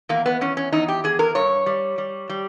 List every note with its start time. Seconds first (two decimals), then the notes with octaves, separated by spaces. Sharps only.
0.09 E2 A#3
0.26 B3
0.41 E2 C#4
0.57 C#4
0.72 E2 D#4
0.88 G4
1.04 E2 G#4
1.19 A#4
1.35 G2 C#5
1.66 G3
1.98 G3
2.29 G3